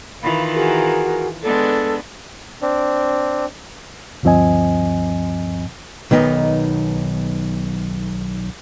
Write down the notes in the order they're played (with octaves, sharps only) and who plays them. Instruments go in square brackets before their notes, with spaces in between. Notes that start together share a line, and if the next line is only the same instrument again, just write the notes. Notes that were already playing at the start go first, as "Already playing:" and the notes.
[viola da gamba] D#3 E3 F4 [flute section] F5 B5
[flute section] F#4 G#4 A#4
[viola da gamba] G#3 B3 D4 [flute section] A4
[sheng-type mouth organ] C4 D4
[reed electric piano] D2 G2 F3 C4 D#5 G#5
[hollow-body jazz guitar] B1 D#3 B3 D#4